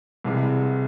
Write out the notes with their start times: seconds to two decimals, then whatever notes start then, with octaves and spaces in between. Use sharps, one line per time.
0.24 C2 C3 E3 G#3